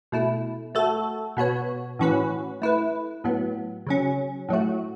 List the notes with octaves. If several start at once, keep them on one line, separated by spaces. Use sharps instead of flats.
B2 A3 E4
A3 F#4 A4
B2 B3 F#4 C#5
A2 E3 C#4 F#4 B4
A3 E4 B4
A2 F#3 B3
C#3 F#3 C#4
A2 F#3 A3 F#4